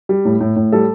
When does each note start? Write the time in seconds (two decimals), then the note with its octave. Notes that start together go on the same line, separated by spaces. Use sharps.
0.09 G3
0.25 A2
0.40 A2
0.56 A2
0.72 G3 A4